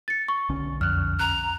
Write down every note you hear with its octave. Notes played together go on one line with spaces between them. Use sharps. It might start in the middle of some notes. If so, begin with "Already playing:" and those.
A6 C#7
C#6
B1 D3 C#4
F2 F6 F#6
A#5 F#6